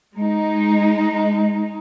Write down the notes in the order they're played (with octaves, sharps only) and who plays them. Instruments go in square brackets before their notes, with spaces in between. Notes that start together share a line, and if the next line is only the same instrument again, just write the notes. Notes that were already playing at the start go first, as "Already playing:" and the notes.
[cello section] G#3 D#4